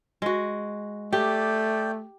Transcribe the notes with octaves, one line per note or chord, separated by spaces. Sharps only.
G#3 F#4
A3 G4 D5 G5